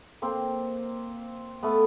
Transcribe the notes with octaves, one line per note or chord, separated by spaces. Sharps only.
A#3 C4
A3 B3